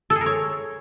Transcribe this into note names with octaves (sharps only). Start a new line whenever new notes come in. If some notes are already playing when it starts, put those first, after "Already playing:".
A4
G#4
A#4
C#5